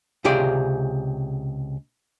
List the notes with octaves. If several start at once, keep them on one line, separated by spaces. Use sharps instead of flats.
C#2 C3 G4 G#4 D5